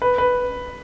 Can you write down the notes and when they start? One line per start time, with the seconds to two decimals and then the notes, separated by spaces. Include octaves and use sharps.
0.02 B4
0.18 B4